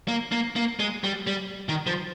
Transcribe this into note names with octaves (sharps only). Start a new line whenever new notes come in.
A#3
A#3
A#3
G#3
G3
G3
D#3
F3